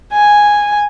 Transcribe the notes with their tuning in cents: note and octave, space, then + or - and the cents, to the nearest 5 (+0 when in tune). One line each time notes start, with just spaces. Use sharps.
G#5 -5